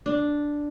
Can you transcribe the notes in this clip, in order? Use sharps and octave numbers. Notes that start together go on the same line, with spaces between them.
D4